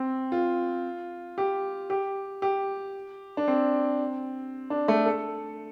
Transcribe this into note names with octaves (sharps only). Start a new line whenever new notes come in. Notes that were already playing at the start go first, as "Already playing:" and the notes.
Already playing: C4
F4
G4
G4
G4
D4
C4
D4
A3
A4